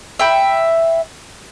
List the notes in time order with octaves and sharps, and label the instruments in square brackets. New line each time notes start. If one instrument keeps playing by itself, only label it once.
[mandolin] E5 G5 B5